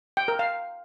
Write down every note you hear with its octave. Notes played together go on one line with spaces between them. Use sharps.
G5
A#4
F5